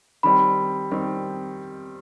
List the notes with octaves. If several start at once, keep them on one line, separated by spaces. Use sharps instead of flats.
D#3 G3 C4 B5
D#3 G3 C4